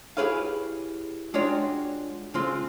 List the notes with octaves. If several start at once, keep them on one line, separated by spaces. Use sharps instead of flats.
E4 G4 G#4 B4 C#5 F5
G#3 D4 F4 F#4 C#5 G5
C#3 G#3 C4 F4 C6